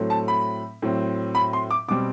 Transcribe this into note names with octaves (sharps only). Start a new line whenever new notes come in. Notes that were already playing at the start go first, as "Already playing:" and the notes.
Already playing: A2 F#3 A3 C4
A5
B5
A2 F#3 C4
B5
C6
D6
B2 G3 C4 D6